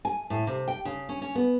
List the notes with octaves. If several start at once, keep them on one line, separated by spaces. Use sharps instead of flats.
G#5
A2
C3
G5
C#3
C#4
C#4
B3